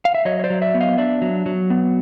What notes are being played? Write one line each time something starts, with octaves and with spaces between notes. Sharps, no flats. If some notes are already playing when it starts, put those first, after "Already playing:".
F5
E5
F#3 C#5 D#5
C#5
C5 D5
F#3
D5 E5
B3
D#5 F5
D4 D5 E5
F#3
F#3
B3